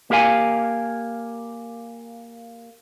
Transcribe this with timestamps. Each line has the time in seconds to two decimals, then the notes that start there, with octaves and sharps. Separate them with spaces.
0.10 A#3 G4 A#4 F5 G#5